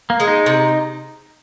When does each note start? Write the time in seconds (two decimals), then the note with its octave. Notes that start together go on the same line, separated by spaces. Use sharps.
0.10 A#3
0.20 G#3
0.28 D#4
0.46 C3